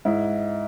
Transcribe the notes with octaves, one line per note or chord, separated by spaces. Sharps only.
G#2 E4